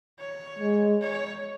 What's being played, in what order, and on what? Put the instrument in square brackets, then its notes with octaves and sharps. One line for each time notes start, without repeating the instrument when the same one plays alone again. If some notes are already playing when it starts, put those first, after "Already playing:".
[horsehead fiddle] C#5
[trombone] G#3
[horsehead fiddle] C#5